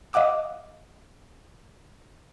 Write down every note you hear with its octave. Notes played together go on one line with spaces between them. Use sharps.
D#5 F5 F#5 D6 E6